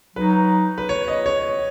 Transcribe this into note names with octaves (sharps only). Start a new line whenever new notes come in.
F#3 D#4 B4
B4
C#5
D#5
C#5